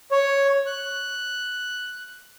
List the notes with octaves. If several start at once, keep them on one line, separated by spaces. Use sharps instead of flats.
C#5
F#6